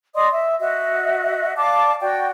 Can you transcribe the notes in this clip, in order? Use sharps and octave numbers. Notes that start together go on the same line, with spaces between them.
D5 D#5 C6 D#6
E5
F#4 D#5 E5
D5 F5 A5 D6
F#4 D5 G5